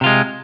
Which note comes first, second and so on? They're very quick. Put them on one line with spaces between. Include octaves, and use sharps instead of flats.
C3 F4 G#3